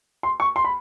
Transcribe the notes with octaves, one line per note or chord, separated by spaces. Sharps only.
C6
C#6
C6
B5